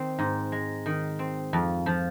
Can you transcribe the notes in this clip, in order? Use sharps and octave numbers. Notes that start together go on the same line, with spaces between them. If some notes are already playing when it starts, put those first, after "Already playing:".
Already playing: D#3 C4
G#2
G#3
D#3
C4
F2
F3